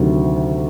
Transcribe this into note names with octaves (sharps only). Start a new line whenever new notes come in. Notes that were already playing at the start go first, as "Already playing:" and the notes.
Already playing: D2 C3 D#3 F#3